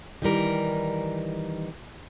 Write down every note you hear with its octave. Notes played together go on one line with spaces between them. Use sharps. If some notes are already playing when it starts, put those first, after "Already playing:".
D#3 E3 G3 A#4